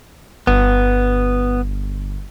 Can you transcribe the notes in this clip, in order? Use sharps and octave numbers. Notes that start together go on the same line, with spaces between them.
G1 B3